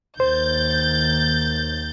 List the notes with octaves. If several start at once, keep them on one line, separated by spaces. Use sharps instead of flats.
D#2 C5 G6 A6